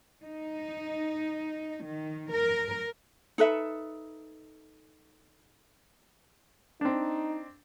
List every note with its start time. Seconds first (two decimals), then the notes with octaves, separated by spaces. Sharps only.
0.24 D#4
1.83 D#3
2.31 A#4
3.38 D#4 A4 B4 E5
6.81 C4 D4 D#4